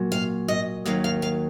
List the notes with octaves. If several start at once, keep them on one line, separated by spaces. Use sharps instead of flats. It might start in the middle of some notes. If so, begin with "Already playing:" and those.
Already playing: A#2 F#3
F5
D#5
D#2 D#3 F#3 F5
F5
F5